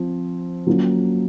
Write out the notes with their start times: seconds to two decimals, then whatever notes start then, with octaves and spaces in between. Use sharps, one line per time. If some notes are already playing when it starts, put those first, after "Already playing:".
Already playing: F3 C4
0.67 F#3 A#3 C#4 F4